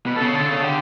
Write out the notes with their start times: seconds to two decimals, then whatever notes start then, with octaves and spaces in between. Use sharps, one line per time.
0.06 B2 B4
0.16 A4
0.20 C#3
0.34 D3 A4
0.49 C#3
0.54 A4
0.62 D3 G4